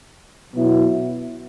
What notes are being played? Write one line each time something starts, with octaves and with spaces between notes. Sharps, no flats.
B2 F#3 B3 E4